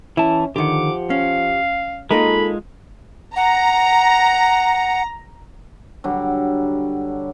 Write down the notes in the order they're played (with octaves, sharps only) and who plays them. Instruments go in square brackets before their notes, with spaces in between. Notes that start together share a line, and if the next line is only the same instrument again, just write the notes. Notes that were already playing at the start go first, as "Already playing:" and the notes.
[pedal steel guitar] E3 A5 [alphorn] C#4 [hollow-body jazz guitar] E4
[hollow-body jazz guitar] D3 D#3 [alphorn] F3 [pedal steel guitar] G4 F#5 [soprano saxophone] D6
[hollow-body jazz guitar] C#4 [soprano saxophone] F5
[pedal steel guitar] G#3 F4 [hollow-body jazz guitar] A#3 D#4 A#4 [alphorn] A4 [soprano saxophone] B5
[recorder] F#5 [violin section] A#5
[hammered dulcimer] D3 F#3 G3